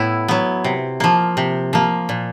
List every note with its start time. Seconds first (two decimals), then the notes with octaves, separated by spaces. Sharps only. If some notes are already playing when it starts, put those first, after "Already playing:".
Already playing: A2 B3 E4
0.28 F#3 B3
0.64 C3
1.00 F3 A#3
1.37 C3
1.73 F3 A#3
2.09 A#2